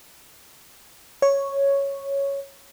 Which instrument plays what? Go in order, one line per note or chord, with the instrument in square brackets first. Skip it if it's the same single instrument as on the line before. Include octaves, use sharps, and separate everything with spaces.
[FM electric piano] C#5